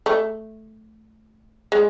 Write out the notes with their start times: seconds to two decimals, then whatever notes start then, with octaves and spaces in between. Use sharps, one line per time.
0.06 A3
1.72 G#3